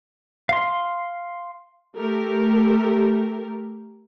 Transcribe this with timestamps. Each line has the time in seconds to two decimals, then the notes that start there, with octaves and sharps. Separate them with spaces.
0.49 F5 C6
1.96 A3 G4 A#4